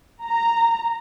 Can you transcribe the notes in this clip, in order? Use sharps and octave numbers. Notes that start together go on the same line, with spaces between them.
A#5